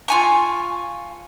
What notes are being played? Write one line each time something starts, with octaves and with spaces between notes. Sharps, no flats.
F4 G#5 C#6